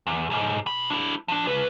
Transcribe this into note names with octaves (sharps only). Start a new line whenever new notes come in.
E2
B1 G#2
B2 B5
D4 E4
F3 D4
C#3 B4